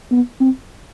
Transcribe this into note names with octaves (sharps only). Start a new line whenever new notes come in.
B3
C4